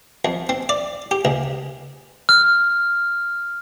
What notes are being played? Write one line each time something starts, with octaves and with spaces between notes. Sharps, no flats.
F2
C4
D5
G4
C#2
F6